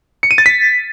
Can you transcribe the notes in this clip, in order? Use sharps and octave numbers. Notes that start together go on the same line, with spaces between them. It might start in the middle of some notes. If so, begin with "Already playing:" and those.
C#7
D#7
A6
B6